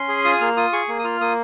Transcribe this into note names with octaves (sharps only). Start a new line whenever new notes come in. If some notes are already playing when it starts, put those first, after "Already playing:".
Already playing: C#4 C6
G#4
F4 D#6
A#3 F6
F4 D#6
G#4 C#6
A#3
D#6
F4 F6
A#3 D#6